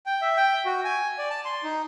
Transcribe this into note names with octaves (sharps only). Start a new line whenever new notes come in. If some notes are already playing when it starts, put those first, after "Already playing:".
G5
E5
G5
F#4
G#5
D5
A5
C6
D#4